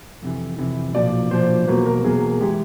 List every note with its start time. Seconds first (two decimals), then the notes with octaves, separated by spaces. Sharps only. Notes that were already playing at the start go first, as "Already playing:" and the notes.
0.22 F2 C3 E3
0.58 F2 C3 E3
0.94 B1 A#2 F3 D5
1.31 B1 A#2 F3 C5
1.68 E2 B2 F#3 A#3 B4
1.86 A#4
2.04 E2 B2 F#3 A#3 G#4
2.41 E3 G#3 G4